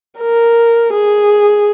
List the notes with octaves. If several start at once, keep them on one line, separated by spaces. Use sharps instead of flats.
A#4
G#4